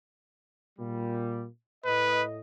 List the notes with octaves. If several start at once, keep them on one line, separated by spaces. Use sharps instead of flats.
A#2 G3
A2 B4 D#5